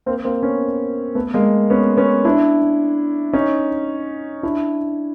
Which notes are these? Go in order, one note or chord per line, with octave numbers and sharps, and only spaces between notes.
A#3 C4
A#3 C4
B3 C#4
A3 B3
G#3 A#3
B3 C#4
B3 C#4
D4 E4
C#4 D#4
D4 E4